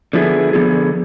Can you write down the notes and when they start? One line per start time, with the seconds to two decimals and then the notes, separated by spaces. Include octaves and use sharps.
0.13 D3 F3 B3 E4 G#4
0.53 D3 F3 B3 E4 G#4